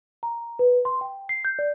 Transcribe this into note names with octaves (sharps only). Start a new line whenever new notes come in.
A#5
B4
C6
G5
C7
G6
D5